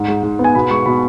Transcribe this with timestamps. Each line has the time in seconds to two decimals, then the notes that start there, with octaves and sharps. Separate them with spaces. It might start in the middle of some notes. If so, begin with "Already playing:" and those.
Already playing: G#2
0.08 G#3
0.23 G#2
0.39 B3
0.44 G#5
0.55 B2 B5
0.71 G#3 C#6
0.86 B2 B5